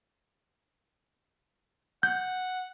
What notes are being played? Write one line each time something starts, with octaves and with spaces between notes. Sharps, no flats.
F#5 G6